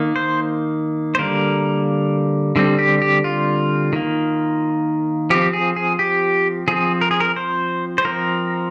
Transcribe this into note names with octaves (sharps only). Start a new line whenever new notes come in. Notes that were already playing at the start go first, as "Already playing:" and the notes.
Already playing: D#3 A#3
C5
C5
D3 G3 A#3 A#4
D3 G3 C4
G4
G4
F4
D#3 A#3
F3 C4 G4
G#4
G#4
G4
F3 C4 G#4
A#4
G#4
A#4
C5
C5
F3 C4 A#4